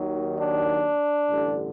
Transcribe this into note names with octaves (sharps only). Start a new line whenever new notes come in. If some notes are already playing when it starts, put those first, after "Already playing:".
Already playing: D#2 D#3 F#3
D4
A1 G2 D3